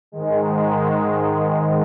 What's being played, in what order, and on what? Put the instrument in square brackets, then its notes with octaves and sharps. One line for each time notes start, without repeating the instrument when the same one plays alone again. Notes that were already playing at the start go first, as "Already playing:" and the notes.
[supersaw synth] G#2 D#3 G#3